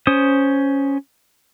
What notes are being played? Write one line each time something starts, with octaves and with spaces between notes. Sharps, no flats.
C#4 C5 D#6